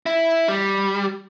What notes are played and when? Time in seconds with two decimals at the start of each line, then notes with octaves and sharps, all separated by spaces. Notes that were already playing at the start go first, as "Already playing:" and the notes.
0.06 E4
0.49 G3